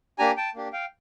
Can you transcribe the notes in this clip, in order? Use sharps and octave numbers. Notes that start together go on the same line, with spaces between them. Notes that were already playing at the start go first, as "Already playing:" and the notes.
A#3 D4 G4 G#5 A#5
G5 A5
A#3 D4 G4
F5 G5